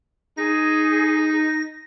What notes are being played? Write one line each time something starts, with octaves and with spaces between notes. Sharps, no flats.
D#4 G#4 A#6